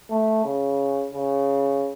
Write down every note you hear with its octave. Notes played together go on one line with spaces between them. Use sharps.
A3
C#3
C#3